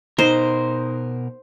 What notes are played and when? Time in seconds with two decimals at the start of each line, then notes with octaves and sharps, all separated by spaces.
0.19 B2 D#4 A#4 C5